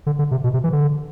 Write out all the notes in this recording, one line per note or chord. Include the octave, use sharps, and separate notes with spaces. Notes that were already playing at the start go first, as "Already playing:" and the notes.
D3
D3
C3
B2
C3
E3
D3